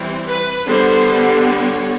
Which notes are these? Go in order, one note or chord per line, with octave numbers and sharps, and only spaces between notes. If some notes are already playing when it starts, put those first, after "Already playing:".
Already playing: E3 G3 C4
B4
D3 G3 B3 C5
C#5